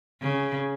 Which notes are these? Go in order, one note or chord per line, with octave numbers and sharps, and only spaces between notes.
C#3